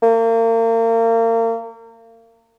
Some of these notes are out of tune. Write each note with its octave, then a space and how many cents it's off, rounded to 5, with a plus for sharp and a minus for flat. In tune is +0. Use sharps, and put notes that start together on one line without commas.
A#3 -35